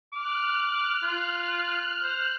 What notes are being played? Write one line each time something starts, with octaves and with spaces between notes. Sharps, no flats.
D6 F6 F#6
F4
C5